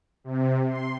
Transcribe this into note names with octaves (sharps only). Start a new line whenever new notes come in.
C3
C6